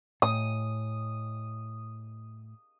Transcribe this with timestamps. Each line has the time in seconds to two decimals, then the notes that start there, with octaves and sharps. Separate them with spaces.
0.22 A2 D#6